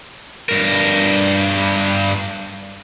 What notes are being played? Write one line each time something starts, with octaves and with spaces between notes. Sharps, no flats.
G2 A#4